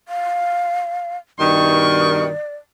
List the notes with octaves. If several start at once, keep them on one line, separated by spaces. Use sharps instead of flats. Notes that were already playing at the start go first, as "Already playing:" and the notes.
F5
G2 B2 D#3 D5 C#6